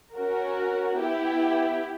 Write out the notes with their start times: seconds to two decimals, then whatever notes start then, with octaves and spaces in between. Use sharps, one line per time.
0.15 C#4 F#4 A#4
0.98 B3 E4 G4